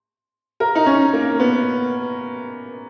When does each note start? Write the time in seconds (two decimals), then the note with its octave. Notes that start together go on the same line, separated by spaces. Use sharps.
0.60 A#4
0.75 D#4
0.86 C#4
1.13 A#3
1.40 B3